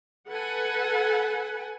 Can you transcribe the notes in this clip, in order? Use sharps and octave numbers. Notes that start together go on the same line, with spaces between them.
A4 B4 F#5 G#5